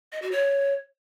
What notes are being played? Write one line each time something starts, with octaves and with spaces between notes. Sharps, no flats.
D#5
F#4
C#5